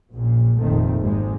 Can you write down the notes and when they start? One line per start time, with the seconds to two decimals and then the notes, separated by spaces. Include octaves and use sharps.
0.12 A#1 F#2 A#2
0.58 F1 A#1 A#2 D#3 A3 C4
1.01 G#1 C3 G#3